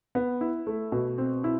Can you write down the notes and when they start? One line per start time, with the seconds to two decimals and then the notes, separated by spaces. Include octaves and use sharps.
0.15 B3
0.41 E4
0.67 A3
0.92 B2
1.18 C4
1.44 E4